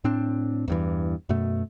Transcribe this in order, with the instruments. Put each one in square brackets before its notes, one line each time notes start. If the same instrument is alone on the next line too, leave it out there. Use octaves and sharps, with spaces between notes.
[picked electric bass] A2 C4 D4
E2 G2 E3
F#2 B2 A3